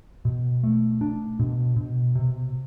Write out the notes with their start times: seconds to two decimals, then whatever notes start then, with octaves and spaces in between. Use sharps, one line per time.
0.25 B2
0.63 A3
1.01 D4
1.39 B2
1.76 B2
2.15 C3